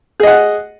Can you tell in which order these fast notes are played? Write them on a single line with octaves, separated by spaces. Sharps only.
G#4 D#5 F#5